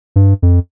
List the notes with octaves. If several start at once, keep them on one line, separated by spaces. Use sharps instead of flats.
G2
F2